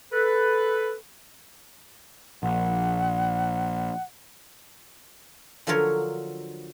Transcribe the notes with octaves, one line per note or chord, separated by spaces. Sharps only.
A4 B4
A#1 F#5
D3 F3 F#3 F4 A#4 C#5